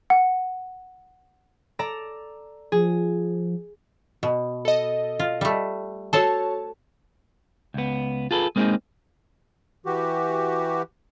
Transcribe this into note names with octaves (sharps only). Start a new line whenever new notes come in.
F#5
A4 D5 A#5
F3 G#4
B2
A4 D#5
F4
G3 A3
F#4 A4 C5 C#5 A5
C#2 B3
F4 G#4 A4 B4
G#3 A#3 C4 D#4 G#4
E3 F#4 G4